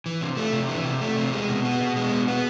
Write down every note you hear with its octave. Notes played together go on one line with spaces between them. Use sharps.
E3
C3
A3
C3
E3
C3
A3
C3
G#3
B2
B3
B2
G#3
B2
B3